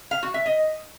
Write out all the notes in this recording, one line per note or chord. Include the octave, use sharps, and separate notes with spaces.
F5
F#4
E5
D#5